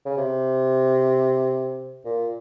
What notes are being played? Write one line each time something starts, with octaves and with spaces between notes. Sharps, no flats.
C#3
C3
A#2